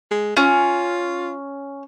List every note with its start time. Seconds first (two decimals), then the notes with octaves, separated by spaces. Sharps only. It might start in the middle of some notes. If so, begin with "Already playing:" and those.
0.11 G#3
0.37 C#4 F4